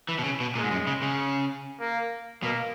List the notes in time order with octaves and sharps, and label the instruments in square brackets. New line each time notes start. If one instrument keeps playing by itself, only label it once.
[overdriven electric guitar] E3
B2
C#3
B2
[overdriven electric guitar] A#2 [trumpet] G#3
[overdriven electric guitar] G#2
F#2
C#3
C#3
[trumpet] A#3
[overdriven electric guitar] B2 [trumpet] A#3